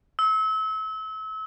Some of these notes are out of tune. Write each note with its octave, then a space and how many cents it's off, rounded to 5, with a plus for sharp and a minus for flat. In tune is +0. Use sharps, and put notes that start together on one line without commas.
E6 -35